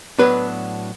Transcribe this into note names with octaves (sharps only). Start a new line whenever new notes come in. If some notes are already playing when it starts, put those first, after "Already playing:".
A2 F#3 B3 D4 B4